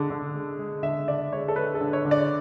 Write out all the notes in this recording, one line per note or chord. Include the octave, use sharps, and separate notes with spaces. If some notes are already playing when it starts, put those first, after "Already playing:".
Already playing: D3 G#3
D3
G#3
G#3
D3 E5
D3 D5
G#3 C#5
A4
G#3 B4
A4
D3
C#5
D3
D5